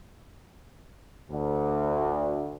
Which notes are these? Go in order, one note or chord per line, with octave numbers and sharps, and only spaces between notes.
D2